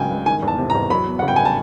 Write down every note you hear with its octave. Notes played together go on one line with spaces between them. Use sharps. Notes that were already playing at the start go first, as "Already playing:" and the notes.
Already playing: C#2 C#3 F#3 G5 G#5
C#2
D#3 G#5
E2
A5
C3
A#5
E2
F#3 B5
B3
C#3 F#5
G5
G#5
A5